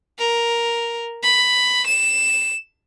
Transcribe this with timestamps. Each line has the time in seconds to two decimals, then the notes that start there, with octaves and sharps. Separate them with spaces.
0.19 A#4
1.23 B5
1.87 E7